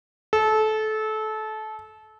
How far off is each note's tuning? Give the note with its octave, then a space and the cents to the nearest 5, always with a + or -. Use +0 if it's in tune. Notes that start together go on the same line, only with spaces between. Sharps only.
A4 -25